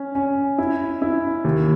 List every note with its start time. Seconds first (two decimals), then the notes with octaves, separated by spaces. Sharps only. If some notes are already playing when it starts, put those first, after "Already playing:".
Already playing: C#4
0.15 C#4
0.58 E4
1.02 E4
1.44 D#2